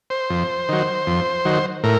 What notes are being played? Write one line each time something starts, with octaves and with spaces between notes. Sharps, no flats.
C5
F2
D#3 F#3
F2
D#3 F#3
A2 A#4